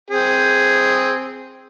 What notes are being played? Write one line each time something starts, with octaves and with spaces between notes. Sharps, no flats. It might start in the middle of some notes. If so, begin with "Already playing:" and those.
C4 G#4